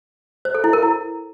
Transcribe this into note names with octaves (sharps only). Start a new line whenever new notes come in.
C5
A4
E4
A#4
E4